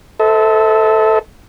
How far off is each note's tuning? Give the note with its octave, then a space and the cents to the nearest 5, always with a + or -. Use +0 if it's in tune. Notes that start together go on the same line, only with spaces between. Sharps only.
A4 +0 C5 -35 E5 -35